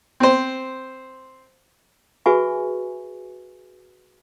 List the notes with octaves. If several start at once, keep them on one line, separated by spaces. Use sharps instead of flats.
C4 C5
F#4 G#4 B4 E5 G#5 C#6